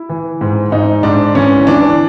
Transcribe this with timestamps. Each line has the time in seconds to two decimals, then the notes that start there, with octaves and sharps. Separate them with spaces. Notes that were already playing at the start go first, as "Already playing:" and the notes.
Already playing: E4
0.09 E3
0.41 G#2
0.72 G#2 D#4
1.03 G#2 D4
1.35 E3 C#4
1.67 E3 D4